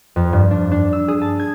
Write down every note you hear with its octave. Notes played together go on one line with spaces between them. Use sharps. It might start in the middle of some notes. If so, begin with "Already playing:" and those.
F2
G2
D4
D4
E6
G#4
A5
G#6